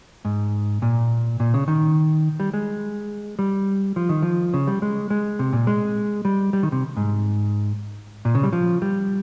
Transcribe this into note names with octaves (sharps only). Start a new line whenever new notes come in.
G#2
A#2
A#2
C#3
D#3
G3
G#3
G3
F3
D#3
F3
C#3
G3
G#3
G#3
C3
A#2
G#3
G3
G3
D#3
C3
G#2
A#2
C#3
G3
F3
G3